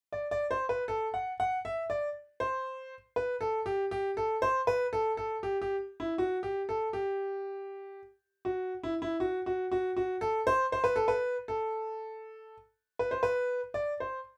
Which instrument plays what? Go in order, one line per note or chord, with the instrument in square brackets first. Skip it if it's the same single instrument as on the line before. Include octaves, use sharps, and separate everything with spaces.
[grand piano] D5
D5
C5
B4
A4
F#5
F#5
E5
D5
C5
B4
A4
G4
G4
A4
C5
B4
A4
A4
G4
G4
E4
F#4
G4
A4
G4
F#4
E4
E4
F#4
F#4
F#4
F#4
A4
C5
C5
B4
A4
B4
A4
B4
C5
B4
D5
C5